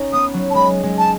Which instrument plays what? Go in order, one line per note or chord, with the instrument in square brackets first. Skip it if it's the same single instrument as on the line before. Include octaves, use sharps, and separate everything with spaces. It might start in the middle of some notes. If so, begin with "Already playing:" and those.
Already playing: [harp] C#4 D#4
[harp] B3 [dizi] D#6
[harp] F#3
[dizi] A5
[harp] G#3 [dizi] B5
[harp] G#3
[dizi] A5